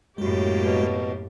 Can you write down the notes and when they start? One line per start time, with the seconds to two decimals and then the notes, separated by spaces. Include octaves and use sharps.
0.18 F#2 A2 G#3 A#3 F#4 G4
0.63 B2